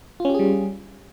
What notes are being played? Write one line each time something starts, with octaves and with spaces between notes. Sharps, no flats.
G3 C#4 F4 G4 G#4